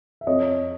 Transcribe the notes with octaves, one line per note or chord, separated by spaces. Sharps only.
E5
F2 C#5 D#5